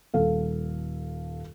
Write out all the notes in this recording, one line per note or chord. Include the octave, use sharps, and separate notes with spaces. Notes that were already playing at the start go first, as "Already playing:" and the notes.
D#1 A4 F5